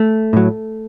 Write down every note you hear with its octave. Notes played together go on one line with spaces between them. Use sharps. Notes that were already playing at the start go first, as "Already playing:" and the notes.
Already playing: A3
A2 F#3